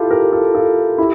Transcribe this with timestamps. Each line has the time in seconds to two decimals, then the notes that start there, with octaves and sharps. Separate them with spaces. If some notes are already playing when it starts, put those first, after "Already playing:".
Already playing: E4 F4 G4 A4
0.11 G4 A#4
0.33 F4 A4
0.54 F4 A4
0.98 E4 G4